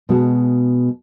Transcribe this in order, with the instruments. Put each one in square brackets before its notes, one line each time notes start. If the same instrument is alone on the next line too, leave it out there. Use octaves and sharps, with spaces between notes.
[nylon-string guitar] B2 G#3 F#4 A5